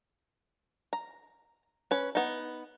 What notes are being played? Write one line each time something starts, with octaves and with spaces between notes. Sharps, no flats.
A#5
C#4 B4
B3 D#4